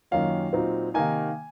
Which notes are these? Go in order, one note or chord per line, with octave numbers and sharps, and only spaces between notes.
F#2 D#3 A#3 C#4 F4 F5
A#2 F#3 C4 D#4
C3 D#3 A#3 D#4 G#5